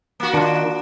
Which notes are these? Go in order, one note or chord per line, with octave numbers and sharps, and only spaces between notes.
A#3 F#4
D#3 D4 F4